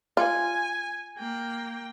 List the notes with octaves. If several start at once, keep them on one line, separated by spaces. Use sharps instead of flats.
F4 G#5
A#3 G5